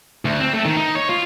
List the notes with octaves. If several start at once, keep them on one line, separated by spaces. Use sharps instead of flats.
D2
C4
A3
D#3
D#4
C#5
F4